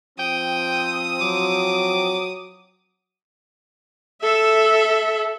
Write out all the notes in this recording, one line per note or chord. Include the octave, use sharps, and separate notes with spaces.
F3 C4 G5 D#6
F#3 D6
A4 E5